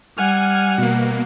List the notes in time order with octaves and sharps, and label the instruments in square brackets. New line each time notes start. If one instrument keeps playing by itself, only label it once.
[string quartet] G3 [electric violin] F#5 [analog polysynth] G#5 F6
[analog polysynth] B2 A#3